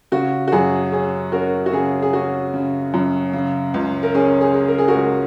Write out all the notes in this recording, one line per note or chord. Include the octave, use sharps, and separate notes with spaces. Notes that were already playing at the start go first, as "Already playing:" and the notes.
C#3 F#4
F#4
F#2 G#4
C#4 G#4
C#4 F#4 A#4
F#4
C#3 G#4
G#4
C#4 F#4
C#3
F#2
C#3
C#2
A#4
C#4 G#4
G#4
G#3
A#4
G#4
F#4 A#4
C#2